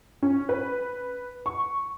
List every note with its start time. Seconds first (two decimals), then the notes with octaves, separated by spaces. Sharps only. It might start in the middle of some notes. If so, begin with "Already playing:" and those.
0.23 C#4
0.49 B4
1.46 C#6